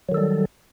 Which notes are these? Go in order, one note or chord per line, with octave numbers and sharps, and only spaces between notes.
D#3 F#3 G3 A4